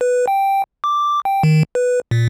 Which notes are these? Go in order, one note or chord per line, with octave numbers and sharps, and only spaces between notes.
B4
G5
D6
G5
D#3
B4
A#2